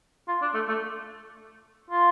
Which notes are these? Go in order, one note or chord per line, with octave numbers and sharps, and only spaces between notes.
F4
D4
A3
A3
F4